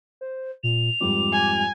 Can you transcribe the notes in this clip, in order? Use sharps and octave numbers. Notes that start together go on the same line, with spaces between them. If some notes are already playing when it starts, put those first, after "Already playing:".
C5
A#2 F7
F2 G#2 G3 D6
G#5